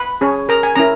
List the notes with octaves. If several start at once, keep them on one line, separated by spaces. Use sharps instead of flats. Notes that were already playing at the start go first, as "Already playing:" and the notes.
Already playing: B4 B5
C#4 G#4 C#5
A#4 A#5
G#5
C#4 E4 A#4 A#5